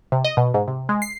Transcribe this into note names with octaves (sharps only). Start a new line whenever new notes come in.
C3
D#5
B2
G#2
C3
G#3
C7